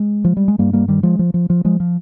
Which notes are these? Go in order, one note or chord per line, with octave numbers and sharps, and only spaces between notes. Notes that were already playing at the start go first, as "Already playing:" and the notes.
Already playing: G#3
F3
G3
G#3
G2 G3 A#3
G3 A#3
D#3 G3
F3 G#3
F3
F3
F3
F3 G#3
F3